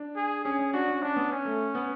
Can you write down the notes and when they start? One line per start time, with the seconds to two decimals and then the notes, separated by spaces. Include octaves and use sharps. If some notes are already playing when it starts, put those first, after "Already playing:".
Already playing: D4
0.16 G#4
0.45 C#4 G#4
0.59 C#4
0.73 D4 F#4
0.88 C#4
1.02 C#4 D4
1.16 B3
1.32 C#4
1.45 A3
1.75 B3